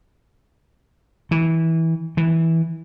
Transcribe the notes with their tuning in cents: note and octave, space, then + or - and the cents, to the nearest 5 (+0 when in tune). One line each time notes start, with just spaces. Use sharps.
E3 -20
E3 -10